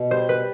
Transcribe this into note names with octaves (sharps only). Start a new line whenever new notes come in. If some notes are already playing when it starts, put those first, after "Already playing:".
Already playing: B2
G3 C5
B4